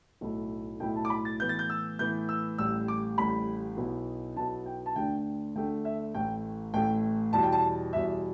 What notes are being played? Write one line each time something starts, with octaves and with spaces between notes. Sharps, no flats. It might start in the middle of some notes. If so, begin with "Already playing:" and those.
B1 A2 A3 E4
B1 A2 A3 E4 G5
A5
D6
B5
A6
A2 E3 B3 E4 G6
A6
G6
E6
A2 E3 B3 E4 G6
E6
A1 A2 G3 E6
D6
A1 A2 G3 B5
B1 B2 B3 E4
B1 B2 B3 E4 A5
G5
A5
D2 D3 A3 D4 G5
D2 D3 A3 D4 G5
E5
A1 A2 A3 G5
A1 A2 A3 G5
E2 B2 G3 E4 A5
G5
A5
E2 B2 G3 E4 E5